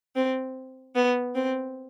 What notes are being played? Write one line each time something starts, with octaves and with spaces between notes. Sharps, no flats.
C4
B3
C4